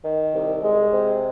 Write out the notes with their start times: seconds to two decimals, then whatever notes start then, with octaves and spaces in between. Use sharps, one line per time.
0.05 D#3
0.34 C2
0.63 G#3
0.92 C3